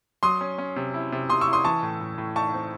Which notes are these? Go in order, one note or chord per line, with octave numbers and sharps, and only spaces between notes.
F#3 C6 D#6
C#4
C#4
C3
E4
C3
C3 C6 D#6
C#6 E6
E4
C6 D#6
E3 A5 C#6
A2
A2
A2
D#4 A5 C#6
C4